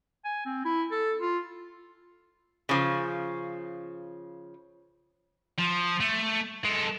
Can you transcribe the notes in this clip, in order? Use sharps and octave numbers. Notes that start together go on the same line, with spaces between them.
G#5
C4
E4
A4
F4
C#3 F3
F3
A3
G#3 A4